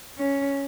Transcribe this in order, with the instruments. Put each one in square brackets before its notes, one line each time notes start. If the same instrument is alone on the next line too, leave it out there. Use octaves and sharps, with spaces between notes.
[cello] C#4